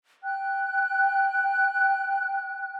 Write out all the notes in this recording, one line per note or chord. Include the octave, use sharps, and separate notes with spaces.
G5 F#6